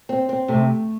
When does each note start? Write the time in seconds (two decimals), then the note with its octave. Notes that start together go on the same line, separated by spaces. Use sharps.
0.09 C4
0.29 C4
0.48 C3 A3